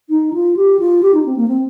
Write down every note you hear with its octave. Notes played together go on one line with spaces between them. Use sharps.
D#4
F4
G4
F4
G4
D#4
C4
A#3
C4